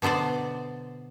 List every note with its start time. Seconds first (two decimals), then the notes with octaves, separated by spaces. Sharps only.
0.02 B2 D3 B3 C5 D5